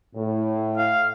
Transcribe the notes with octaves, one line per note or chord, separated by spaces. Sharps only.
A2
F5